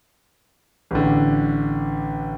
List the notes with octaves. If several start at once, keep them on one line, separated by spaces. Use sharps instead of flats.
A1 D3